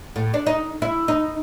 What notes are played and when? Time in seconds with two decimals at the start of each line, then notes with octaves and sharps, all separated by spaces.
0.16 A2
0.34 D4
0.47 D#4
0.82 E4
1.08 D#4